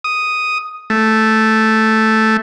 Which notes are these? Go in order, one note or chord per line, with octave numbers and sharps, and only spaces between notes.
D#6
A3